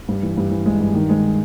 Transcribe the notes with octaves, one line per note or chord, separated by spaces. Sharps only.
G2
E3
G2
E3
G#3
G2
D#3
G#3